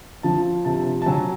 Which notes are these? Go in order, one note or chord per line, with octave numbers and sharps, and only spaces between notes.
F3 A5
C3 A5
A5
F#3 G#5